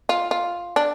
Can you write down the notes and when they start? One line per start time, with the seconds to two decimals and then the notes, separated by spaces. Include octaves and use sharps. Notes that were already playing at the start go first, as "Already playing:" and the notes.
0.09 F4
0.31 F4
0.76 D4